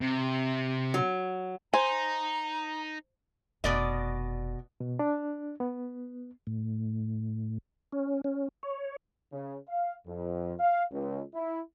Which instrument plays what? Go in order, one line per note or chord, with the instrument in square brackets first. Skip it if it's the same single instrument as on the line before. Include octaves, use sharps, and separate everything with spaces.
[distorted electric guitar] C3
[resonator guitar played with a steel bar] F#3
[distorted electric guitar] D#4 [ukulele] C5 [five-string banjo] G#5 [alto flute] A#5
[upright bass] F1 [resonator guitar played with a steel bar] B2 D5 D#5
[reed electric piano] B2
D4
B3
[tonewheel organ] A2
C#4
C#4
C#5
[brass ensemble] C#3
F5
F2
F5
C#2
E4